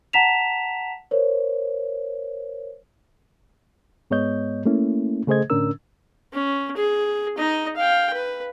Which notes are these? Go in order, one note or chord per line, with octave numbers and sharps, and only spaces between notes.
F#5 A5 A#5 B6 E7 F7
A#4 C5 C#5
G#2 G#3 B3 C#5 D#5 G6
A3 A#3 C#4 E4
C#3 A3 G#4 C5 D#5 G#6
A2 D3 C#4 D4 A#4 E6
C#4
G#4
D#4 D#5
F5 G5
B4